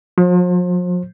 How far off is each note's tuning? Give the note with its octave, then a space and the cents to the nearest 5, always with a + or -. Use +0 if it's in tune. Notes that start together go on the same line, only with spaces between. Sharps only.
F3 +45 C5 +30